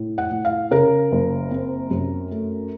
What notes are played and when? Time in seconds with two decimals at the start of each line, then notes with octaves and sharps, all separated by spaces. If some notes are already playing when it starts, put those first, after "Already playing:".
Already playing: A2
0.18 F#5
0.31 A2
0.45 F5
0.71 C#3 A#4
1.12 F#1
1.51 C4
1.91 F#2
2.31 A3